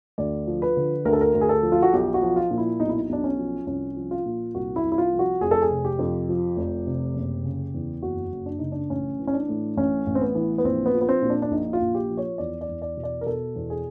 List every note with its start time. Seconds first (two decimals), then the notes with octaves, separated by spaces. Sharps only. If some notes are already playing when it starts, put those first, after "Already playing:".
0.18 D2 D5
0.47 F3
0.62 B4
0.77 D3
1.05 D2 A#4
1.13 A4
1.21 A#4
1.34 D2
1.41 G#4
1.49 A4
1.63 F3
1.72 F4
1.82 F#4
1.93 B1 G4
2.14 F#4
2.22 F3
2.36 F4
2.51 A#2
2.58 E4
2.80 B1 D#4
2.89 E4
2.97 D#4
3.09 B1 D4
3.24 C#4
3.38 F3
3.67 C2 C#4
3.96 F3
4.11 F4
4.26 A#2
4.55 C2 F#4
4.76 E4
4.83 C2
4.92 E4
4.98 F4
5.13 F3
5.19 F#4
5.41 F1 G#4
5.51 A4
5.62 G#4
5.71 C3
5.85 G4
5.99 F2
6.29 F3
6.57 F1
6.87 C3
7.15 F#1
7.44 C#3
7.74 E2
8.02 F#1 F#4
8.32 F#1
8.46 D4
8.59 C#3 D#4
8.72 D4
8.90 A1 C#4
9.19 E3
9.27 C#4
9.34 D4
9.49 A2
9.77 A1 C#4
10.06 A1
10.15 C4
10.21 B3
10.35 E3
10.58 B3
10.64 A#1 C4
10.86 B3
10.94 F3
11.01 B3
11.09 C4
11.22 A#2
11.30 D4
11.42 D4
11.51 A#1 D#4
11.73 F4
11.81 A#1
11.95 G4
12.10 F3
12.17 C#5
12.38 E2 D5
12.61 D5
12.68 E2
12.82 D5
12.97 B2
13.04 D5
13.21 A#4
13.26 B2 A4
13.56 E2
13.70 G#4